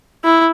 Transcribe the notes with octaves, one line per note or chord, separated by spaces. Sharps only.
E4